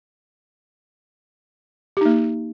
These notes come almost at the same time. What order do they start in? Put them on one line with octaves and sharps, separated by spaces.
G4 D#4 A#3